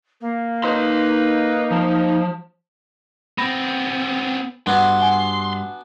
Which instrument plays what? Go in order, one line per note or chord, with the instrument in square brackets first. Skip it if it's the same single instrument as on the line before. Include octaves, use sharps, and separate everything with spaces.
[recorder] A#3
[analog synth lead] D#4 [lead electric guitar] B4 C6
[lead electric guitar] F3
[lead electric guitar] B3 C4 [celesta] B5 A#6
[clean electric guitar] G2 [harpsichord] B3 D4 F#4 [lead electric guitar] C6
[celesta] F#5 G#5